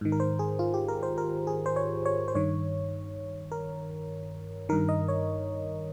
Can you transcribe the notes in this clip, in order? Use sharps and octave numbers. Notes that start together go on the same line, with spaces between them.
G#2 D#3
A#4
C5
G#4
F4
G4
A#4
C5
A#4
G#4
C5
C#5
C#5
C5
G2 D#3 C#5
A#4
G2 D#3 A#4
D#5
C#5